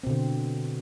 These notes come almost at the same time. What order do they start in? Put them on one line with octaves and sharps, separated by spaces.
C4 B2 D3